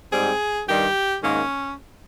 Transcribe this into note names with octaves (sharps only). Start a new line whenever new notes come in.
G#2 G3 C4 G#4
G2 D#3 G3 G4
G#2 D#3 A#3 C#4